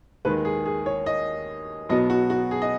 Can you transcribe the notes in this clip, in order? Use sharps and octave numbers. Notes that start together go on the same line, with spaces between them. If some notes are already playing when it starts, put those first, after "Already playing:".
D#2 D#3 G#3 B4
G#4
G#4
C#5
D#5
B1 B2 F#3 B3 D#5
F#4
F#4
G#4
D#5